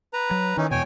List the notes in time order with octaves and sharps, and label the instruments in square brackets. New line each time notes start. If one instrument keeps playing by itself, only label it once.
[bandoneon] B4 A#5
[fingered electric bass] F#3
[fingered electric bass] D#3 [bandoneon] E3 C#4 D#4
[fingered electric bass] E2 B2 [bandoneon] C#5 G5 G#5